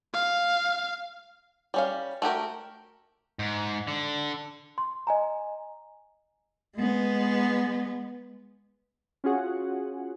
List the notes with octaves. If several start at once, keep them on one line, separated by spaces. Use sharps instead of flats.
F5
G3 C#4 F5
A3 F#4 G4 A#4
G#2
D3
C6
D#5 G#5 A#5
G#3 B3
C#4 F4 F#4 G#4 F#5